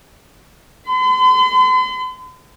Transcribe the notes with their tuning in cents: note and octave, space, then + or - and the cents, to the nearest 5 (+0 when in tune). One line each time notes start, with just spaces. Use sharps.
C6 -45